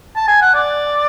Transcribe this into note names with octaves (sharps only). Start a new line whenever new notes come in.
A5
G#5
F#5
D5